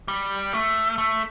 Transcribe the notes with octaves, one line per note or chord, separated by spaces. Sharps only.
G3
A3
A3